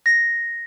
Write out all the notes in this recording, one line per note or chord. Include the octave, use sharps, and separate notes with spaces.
A#6